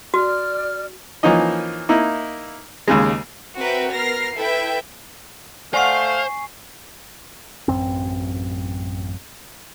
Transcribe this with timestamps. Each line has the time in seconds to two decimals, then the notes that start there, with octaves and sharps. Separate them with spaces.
0.14 F#4 D5 F6
1.23 E3 F3 A#3 C#4 D#4 D#5
1.89 A#3 D#4 E4
2.88 D#2 C#3 G#3
3.58 C4 F#4 A#4 B4 E5 G5
3.92 B3 A#4 F6 A#6 C7
4.35 E4 A4 B4 E5 G5
5.74 A3 C5 D5 F5 F#5 G#5 C#6 C7
7.68 A1 F#2 A#2 C4